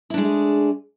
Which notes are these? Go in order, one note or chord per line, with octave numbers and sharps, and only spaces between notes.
G#3 A3 D4 E4 G#4